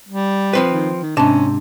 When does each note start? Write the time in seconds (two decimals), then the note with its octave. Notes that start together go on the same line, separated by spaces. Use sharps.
0.09 G3
0.53 F3 C4 B4
0.70 D#3
1.02 D#3
1.17 G#2 C3 C#4 D4 A5